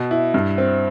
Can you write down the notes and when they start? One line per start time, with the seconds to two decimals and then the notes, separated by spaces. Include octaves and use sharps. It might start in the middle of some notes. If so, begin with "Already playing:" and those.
Already playing: B2
0.11 E4
0.34 G2
0.58 C4